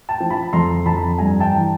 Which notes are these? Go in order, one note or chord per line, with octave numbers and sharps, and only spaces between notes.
G5 A5
F3
A5 B5
F2 A#5 C6
F2 A5 B5
G2 G#5 A#5
G5 A5
E3